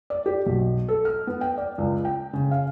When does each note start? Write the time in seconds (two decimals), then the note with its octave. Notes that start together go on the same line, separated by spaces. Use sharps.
0.10 D5
0.26 G4
0.46 B1
0.88 A4
1.05 F6
1.27 B3
1.41 G5
1.58 D5
1.78 C#2
2.05 G5
2.33 C#3
2.51 F5